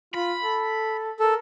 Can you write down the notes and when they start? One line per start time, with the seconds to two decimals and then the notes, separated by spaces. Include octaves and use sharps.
0.14 F4 B5
0.44 A4
1.20 A4 A#4